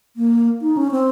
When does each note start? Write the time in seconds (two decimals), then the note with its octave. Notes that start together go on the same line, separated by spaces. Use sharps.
0.16 A#3
0.62 D#4
0.77 C#4
0.91 C4